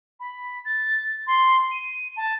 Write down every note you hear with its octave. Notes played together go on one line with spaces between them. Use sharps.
B5
A6
C6
D#7
A5